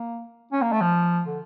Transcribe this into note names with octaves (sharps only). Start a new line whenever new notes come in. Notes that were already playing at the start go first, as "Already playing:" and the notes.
Already playing: A#3
C#4
A#3
A3
F3
D3